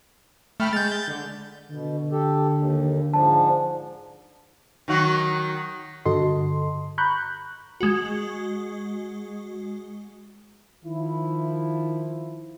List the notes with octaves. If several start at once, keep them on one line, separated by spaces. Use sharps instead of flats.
A3 G5 B5 F6
G#3 G6 A6
D3
B2 D3
G4 A4
D#2
G#2 F3 D4 A5
D#3 F#3 F#4
G2 D3 F#4 A4 D#5 C6
A#5 B5 C#6 F#6 G6
G#3 F#4
D#3 F3 E4